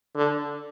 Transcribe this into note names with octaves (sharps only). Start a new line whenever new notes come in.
D3